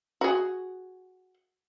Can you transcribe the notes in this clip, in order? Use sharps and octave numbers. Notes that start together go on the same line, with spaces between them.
F#4 G#4